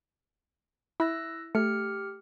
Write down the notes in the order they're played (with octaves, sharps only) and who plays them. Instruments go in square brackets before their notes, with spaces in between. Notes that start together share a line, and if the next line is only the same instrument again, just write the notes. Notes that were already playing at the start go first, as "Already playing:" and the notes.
[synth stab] E4 [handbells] E6 F#6 A#6
[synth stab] A3 [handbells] G4 F6 C#7